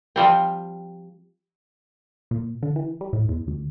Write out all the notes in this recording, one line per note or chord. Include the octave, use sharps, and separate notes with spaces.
F3 G3 C4
A#2
D3
E3
G3
A2
E2
D2